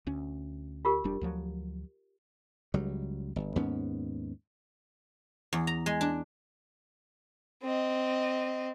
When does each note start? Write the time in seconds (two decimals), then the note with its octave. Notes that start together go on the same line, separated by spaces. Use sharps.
0.07 D2 C#4
0.85 F4 G4 A#4
1.04 F1 G3 D4
1.21 D2 F3 F#3
2.74 C#2 F#3 G3
3.36 G1
3.56 D#2 G#2 B3 C#4
5.53 E2
5.67 A#5
5.86 G#3
6.01 D4
7.62 C4 D#5